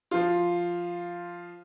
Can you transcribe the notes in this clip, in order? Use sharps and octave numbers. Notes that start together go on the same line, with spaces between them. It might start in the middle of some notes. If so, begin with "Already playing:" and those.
F3 F4